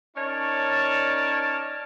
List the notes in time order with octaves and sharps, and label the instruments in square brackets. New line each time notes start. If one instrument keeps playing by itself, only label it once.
[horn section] C#4 D#4 A#4 C#5 D5 A5